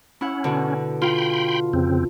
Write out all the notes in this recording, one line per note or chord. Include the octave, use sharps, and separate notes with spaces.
C#4 E4 F#5
B2 D3
F4 G5 B5 C6
F2 C#3 C4